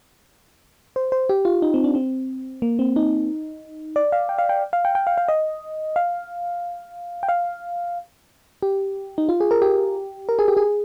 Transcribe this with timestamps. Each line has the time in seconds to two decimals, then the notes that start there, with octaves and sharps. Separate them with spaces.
0.96 C5
1.12 C5
1.29 G4
1.45 F4
1.62 D#4
1.74 C4
1.84 D4
1.95 C4
2.62 A#3
2.79 C4
2.96 D#4
3.96 D5
4.12 F5
4.29 G5
4.39 F5
4.49 G5
4.73 F5
4.85 G5
4.95 G5
5.07 F5
5.18 F5
5.28 D#5
5.96 F5
7.23 G5
7.29 F5
8.63 G4
9.18 D#4
9.29 F4
9.41 G#4
9.51 A#4
9.62 G4
10.29 A#4
10.39 G#4
10.48 G4
10.57 G#4